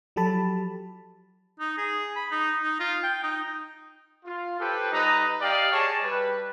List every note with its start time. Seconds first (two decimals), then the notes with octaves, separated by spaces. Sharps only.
0.16 F3 F#3 G4 A4 A5 B5
1.60 D#4
1.77 G#4
2.16 B5
2.31 D#4
2.62 D#4
2.80 F4
3.03 G5
3.23 D#4
4.25 F4
4.60 G4 A4 B4 C5 G5
4.92 G3 D#4 B4 D#5 A#5
5.41 G4 D5 D#5 F5 G5
5.72 G#4 C#5 D#5 A5
6.04 G3 G4 B4